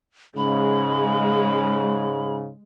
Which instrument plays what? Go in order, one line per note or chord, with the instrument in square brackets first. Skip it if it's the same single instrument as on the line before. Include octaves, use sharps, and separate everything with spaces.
[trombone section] G#2 C#3 [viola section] G#3 [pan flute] B5